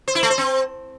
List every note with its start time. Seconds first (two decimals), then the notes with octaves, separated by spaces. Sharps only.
0.08 C5
0.15 E4
0.23 A3
0.30 C5
0.38 C4